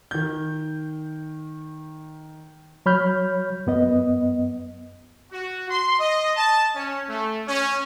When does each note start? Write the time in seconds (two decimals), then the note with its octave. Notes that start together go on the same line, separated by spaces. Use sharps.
0.11 D#3 G6
2.86 F#3 C#5 B5 F6 G6
3.67 F#2 B3 D#5
5.32 F#4
5.70 C6
5.99 D#5
6.37 A5
6.75 C#4
7.08 A3
7.47 C#4